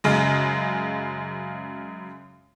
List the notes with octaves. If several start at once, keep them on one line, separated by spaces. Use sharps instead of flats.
F#2 C#3 G#3